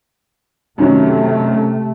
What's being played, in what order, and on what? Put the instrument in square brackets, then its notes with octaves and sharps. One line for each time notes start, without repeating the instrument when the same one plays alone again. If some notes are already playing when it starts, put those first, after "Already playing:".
[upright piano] F#2 D#3 F#3 [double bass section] C3 A3